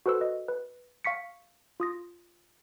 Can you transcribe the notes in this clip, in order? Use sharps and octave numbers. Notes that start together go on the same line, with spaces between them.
F#4 A4 B4 C5 E6
B4 D#5
B4
F5 C#6 B6 C#7
F4 D#6 A#6